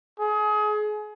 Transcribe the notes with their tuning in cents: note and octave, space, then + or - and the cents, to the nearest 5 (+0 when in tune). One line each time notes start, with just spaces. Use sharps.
G#4 +30